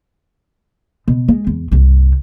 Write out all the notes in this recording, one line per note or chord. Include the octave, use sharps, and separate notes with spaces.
B2
G#3
E2
C2 G2